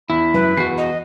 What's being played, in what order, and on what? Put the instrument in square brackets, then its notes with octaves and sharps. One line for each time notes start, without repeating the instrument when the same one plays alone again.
[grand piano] E2 [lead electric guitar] E4 [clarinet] B5
[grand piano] F#2 [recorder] B4
[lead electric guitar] E2 F#4 [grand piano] C7
[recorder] D#5